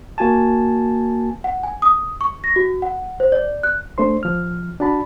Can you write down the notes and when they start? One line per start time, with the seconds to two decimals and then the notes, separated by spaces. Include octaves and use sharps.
0.18 A#3 F#4 G#5 A5
1.44 F#5
1.63 G#5
1.82 D#6
2.21 C#6
2.44 A#6
2.56 F#4
2.82 F#5
3.20 C5
3.32 D5
3.63 F#6
3.98 A3 D4 C5 C6
4.23 F3 F6
4.80 D4 F#4 A5 B5